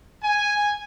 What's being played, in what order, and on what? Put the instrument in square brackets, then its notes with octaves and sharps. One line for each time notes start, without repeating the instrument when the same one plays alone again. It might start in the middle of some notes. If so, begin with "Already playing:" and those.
[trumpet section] G#5